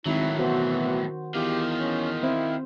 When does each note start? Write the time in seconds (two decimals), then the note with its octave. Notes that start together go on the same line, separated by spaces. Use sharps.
0.06 G#1 A2 D#3 F#3 E4
0.39 B2 E3 F#4 C5
1.34 E2 D#3 F4 G4
1.79 C#4
2.23 C4 E4 C5